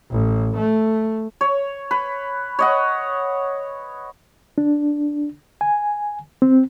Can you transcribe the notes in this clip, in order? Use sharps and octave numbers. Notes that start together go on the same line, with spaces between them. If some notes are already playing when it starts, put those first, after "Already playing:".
A1
A3
C#5
B4
C#5 D#5 F#5
D4
G#5
C4